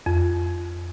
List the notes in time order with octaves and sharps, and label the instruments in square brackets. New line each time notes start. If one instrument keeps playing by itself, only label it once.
[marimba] F2